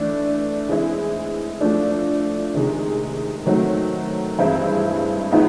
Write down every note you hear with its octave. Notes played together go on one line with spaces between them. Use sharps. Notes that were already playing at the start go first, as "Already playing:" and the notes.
Already playing: E3 A3 D4
E3 G#3 C4 E4
F3 A3 D4
C3 D#3 G#3
D#3 F#3 A3 C4
G2 E3 G#3 C4 E4
A2 F3 G#3 B3 D#4